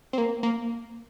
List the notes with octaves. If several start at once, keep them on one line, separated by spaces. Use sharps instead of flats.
C4
A#3
A#3